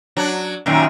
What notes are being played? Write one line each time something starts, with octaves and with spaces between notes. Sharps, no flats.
F#3 D4
F#2 A#2 D#3